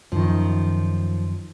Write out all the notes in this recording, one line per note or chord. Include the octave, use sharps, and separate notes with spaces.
F#2 D#3 F3